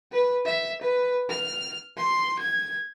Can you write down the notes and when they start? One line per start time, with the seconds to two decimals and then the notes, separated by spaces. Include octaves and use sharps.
0.12 B4
0.46 E5
0.81 B4
1.30 F6
1.97 C6
2.39 G#6